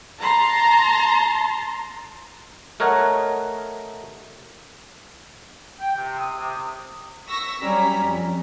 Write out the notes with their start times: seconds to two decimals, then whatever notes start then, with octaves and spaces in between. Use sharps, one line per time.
0.19 A5 A#5 C6
2.80 A3 A#4 C#5 D#5 F#5
5.80 G5
5.96 C3
6.18 D#6
6.38 C3
7.28 C#6 E6 A#6 B6
7.61 F#3 G3 C#4 A#5 B6
8.03 F2